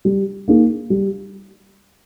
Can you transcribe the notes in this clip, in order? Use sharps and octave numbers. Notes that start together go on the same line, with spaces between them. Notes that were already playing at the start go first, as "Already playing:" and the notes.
G3
A#3 D#4 G#4
G3